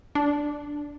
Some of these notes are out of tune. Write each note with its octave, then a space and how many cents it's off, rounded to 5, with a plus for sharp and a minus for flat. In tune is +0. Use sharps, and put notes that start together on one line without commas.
D4 +0